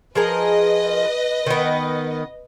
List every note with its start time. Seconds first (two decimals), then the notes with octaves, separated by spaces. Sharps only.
0.15 F3 G#4 A#4 B4 D#5
1.46 D#3 B3